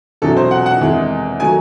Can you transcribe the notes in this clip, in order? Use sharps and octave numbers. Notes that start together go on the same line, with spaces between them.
E1 E2 C3 F#3 A4
C5
F#5
F#5
E2 C3 D#3 G#3
D#3 F#3 A3 G#5